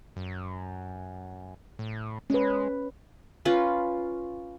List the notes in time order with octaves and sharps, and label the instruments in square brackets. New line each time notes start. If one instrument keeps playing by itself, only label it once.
[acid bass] F#2
A2
[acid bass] G#3 [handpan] C#4 B4
[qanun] C#4 F4 B4